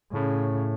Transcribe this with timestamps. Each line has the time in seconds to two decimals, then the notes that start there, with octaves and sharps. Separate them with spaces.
0.13 A2 C#3